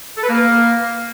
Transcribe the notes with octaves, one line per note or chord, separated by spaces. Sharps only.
A4
B4
A#3